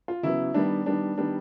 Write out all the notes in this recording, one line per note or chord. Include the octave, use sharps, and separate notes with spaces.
F4
C#3 F#3 B3 E4
D#3 G3 B3 D4
D#3 G3 B3 D4
D#3 G3 B3 D4